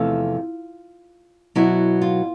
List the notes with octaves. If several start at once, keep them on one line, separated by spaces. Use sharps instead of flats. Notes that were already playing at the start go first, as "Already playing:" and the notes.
Already playing: E2 C3 F3 A3 F4
B2 F#3 B3 E4
F4